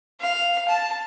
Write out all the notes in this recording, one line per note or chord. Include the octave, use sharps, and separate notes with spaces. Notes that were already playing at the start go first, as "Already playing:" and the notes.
F5
A5